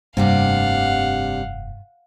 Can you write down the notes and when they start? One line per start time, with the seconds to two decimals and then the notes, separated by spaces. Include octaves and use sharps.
0.17 F1 G2 C3 G3 A#3 D4 F5 F#5